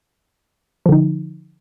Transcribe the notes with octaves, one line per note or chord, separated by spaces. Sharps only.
D3 F3 D#4